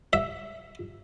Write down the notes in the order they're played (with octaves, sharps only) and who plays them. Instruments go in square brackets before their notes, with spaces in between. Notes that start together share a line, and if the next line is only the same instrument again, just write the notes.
[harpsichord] E5